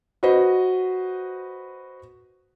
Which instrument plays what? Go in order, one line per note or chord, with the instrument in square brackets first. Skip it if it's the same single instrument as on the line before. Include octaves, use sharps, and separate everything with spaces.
[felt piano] F#4 B4 C5 D#5